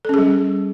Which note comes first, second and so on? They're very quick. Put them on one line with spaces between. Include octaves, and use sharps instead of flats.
A4 C#4 G#4 G3